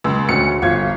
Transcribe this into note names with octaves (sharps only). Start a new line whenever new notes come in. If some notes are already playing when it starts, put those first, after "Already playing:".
C#2 C6 E6
D2 C#4 C#7
G1 F4 G#6